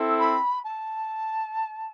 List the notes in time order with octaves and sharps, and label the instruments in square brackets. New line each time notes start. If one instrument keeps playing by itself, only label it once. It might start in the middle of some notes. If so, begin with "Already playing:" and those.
Already playing: [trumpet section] C4 E4 A4
[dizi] B5
A5